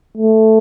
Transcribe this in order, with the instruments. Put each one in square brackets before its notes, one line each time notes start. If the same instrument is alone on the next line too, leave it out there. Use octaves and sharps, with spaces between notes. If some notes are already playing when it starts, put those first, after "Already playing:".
[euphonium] A3